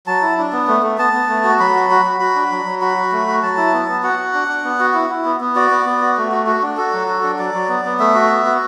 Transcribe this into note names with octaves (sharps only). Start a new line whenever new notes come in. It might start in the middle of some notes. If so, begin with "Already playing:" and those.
F#3 A5
E4
D4
B3
A3
A3
B3 A5
B3
A3
F#4
F#3 B5
F#4
F#4
F#4
F#4 B5
D4
F#3
F#3
F#4 B5
F#4
A3
F#4
F#3 A5
E4
B3
B3
F#4 F#5
F#4
D4
D4
B3
F#4
E4
E4
B3
B3
F#4 D5
B3
B3
F#4
A3
F#4
F#4
D4
F#4 A4
F#3
F#4
D4
F#3 D5
F#3
B3
B3
A3 E5
F#4
B3
F#4